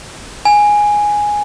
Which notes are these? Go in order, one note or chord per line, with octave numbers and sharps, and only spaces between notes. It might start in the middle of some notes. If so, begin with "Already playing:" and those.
G#5